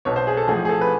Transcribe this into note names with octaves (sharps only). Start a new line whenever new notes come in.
B1 B2 C#5
C5
G#4
A4
A1 A2 F3 G#4
G#4
A4
B4